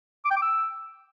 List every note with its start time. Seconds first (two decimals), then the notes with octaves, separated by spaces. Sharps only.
0.25 D6
0.31 G5
0.36 D6
0.42 E6